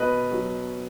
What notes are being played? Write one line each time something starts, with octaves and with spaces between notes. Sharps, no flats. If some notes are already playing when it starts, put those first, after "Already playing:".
Already playing: B2 B4 D#5
F#3